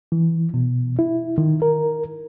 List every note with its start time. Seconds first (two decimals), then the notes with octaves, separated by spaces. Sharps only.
0.12 E3
0.54 B2
0.99 E4
1.38 D#3
1.62 A#4